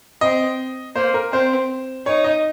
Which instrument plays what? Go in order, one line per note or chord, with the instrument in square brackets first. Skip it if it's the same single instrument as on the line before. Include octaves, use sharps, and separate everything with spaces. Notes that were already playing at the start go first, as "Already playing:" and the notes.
[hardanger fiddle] C4 [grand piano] D#5
[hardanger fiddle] A#3 [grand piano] C5
[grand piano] A#4
[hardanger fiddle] C4 [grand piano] C5
[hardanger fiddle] D#4 [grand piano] C#5
[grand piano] D#5